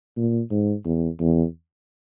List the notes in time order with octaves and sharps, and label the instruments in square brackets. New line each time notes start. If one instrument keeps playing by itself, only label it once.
[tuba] A#2
G#2
E2
E2